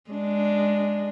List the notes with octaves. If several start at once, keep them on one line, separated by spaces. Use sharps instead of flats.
G#3 D4